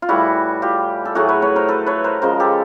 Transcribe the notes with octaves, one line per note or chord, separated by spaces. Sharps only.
F4
A2 E3 G3 E4 F#4
F4 G4
A4
A2 F#3 A3 F#4 G#4
B4 C#5
B4 C#5
A#4 C5
A4 B4
B4 C#5
A#4 C5
C#3 F3 G#3 A#4 C5
G4 A4